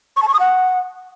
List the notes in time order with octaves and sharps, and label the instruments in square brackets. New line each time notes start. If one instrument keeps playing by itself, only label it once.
[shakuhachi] C#6
A5
C#6
D#6
F#5